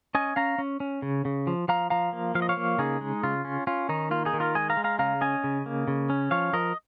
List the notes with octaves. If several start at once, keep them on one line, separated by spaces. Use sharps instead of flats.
C#4 D#5 G#5
C#4 F5 A#5
C#4
C#4
C#3
C#3
F3
F3 F5 A#5
F3 F5 A#5
A#3
F3 F5
D#5
C#5 F5
A#3
C#3 D#4 G#4
G#3
C#3 F4
C#4
C#4 F4
D#3 D#4
A#3 F4
D#4 G#4
D#3
F4 A#4
G#3 D#5 G#5
F5 A#5
G#3
F5 A#5
C#3 F5 A#5
C#4 D#5 G#5
C#3
A#3
C#3
C#4
F3 C#5 F5
F3 A#4 D#5